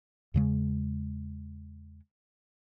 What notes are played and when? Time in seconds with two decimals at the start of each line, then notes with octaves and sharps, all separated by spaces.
0.34 E2 C#3 G#3